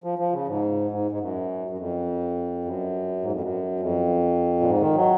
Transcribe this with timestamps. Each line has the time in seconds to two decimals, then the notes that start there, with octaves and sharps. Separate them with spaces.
0.04 F3
0.19 F3
0.32 C#3
0.47 G#2
0.91 G#2
1.11 G#2
1.20 F#2
1.70 F#2
1.78 F2
2.65 F#2
3.22 G#2
3.32 F2
3.41 F#2
3.80 F2
4.60 A#2
4.67 G#2
4.81 D#3
4.96 F#3